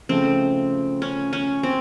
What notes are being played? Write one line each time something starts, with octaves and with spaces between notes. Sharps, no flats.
C#3 F3 A3 C4
C#4
C#4
C4